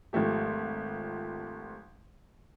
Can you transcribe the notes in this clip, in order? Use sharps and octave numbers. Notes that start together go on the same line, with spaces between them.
G#1 F3 A3 G4